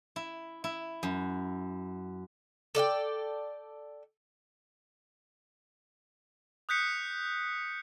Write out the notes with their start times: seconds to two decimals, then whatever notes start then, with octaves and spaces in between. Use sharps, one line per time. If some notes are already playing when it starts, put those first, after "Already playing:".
0.16 E4
0.64 E4
1.03 F#2
2.75 A4 D5 F5 G5
6.69 D#6 F#6 G6 B6 C#7